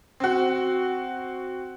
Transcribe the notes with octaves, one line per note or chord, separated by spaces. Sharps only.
C4 F#4